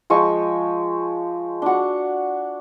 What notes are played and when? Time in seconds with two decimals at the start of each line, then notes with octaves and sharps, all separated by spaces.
0.10 F3 G#3 C#6
1.62 D4 F#4